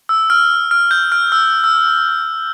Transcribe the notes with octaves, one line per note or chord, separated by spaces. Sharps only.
E6
F6
F6
G6
F6
E6
E6